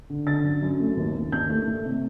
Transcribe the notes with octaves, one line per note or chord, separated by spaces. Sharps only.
D3
D3 A6
F#2
F#2
A3
D#2
D#2
D#2 G6
A3
A3
C3